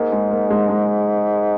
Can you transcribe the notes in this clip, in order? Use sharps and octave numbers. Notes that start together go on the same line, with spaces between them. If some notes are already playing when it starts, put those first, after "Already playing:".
Already playing: G#2 A#3
G#3
A#3
G#3
G#3